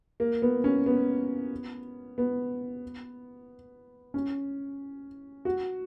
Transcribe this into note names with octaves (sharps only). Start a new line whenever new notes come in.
A#3
B3
C#4
B3
B3
C#4
F#4